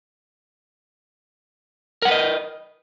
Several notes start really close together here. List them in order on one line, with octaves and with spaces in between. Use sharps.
A#4 F#5 B4 D#5